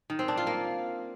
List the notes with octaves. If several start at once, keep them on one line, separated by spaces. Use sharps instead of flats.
D#3
C4
D4
F4
A#3